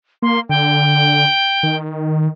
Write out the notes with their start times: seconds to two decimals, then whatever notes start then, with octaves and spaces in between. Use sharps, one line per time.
0.22 A#3 C6
0.49 D3 G5
1.63 D#3